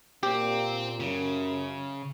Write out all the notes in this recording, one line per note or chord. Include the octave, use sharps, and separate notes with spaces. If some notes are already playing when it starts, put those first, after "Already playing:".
A#2 C4 G4
F#2 C#3